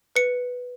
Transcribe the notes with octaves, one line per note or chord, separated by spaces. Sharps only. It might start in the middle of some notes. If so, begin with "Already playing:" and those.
B4 C#7